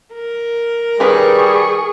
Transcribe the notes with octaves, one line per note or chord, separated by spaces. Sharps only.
A#4
D#3 G3 G#4 B4 C#6